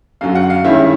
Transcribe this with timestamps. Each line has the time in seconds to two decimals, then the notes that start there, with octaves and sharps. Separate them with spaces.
0.21 F#2 D3 F#3 F5
0.35 F#4 F#5
0.50 F5
0.64 G2 D#3 G#3 C#4 E4 E5